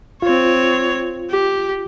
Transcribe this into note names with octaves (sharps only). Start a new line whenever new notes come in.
C4 F4 C#5
G4